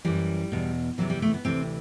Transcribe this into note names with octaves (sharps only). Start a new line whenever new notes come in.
F#2 E3 G3
E2 B2
E2 C3 E3 F#3
G3
A3
B3
D2 C3 E3 C4